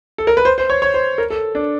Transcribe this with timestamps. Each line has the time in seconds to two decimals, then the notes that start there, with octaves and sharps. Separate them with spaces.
0.18 A4
0.27 A#4
0.37 B4
0.45 C5
0.58 C5
0.70 C#5
0.82 C#5
0.94 C5
1.18 A#4
1.30 A4
1.55 D4